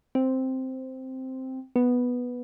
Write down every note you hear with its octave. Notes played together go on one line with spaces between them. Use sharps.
C4
B3